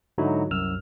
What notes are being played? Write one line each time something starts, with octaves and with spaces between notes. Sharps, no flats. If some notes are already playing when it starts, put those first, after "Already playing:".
G#2 D3 F#3 D#4 E4 F#4
C2 F#2 E6 F6